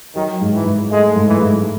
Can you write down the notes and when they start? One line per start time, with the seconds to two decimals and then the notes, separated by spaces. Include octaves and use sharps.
0.16 D#3 F#3
0.41 G#2
0.53 E3
0.65 G#2
0.91 G#3 A3
1.16 G#2
1.28 E3
1.42 G#2